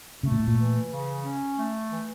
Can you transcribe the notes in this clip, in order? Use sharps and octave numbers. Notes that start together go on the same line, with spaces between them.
C#3 A3
A#2
A2
A#2
E3
C#3
C#4
A3
E3